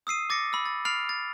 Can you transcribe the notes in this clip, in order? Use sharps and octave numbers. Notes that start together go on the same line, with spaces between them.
D#6 E6 C7 D#7
D6 A6 A#6 C#7
B5 E6
A6
B5 F6 A6 C7 D7 F7
A6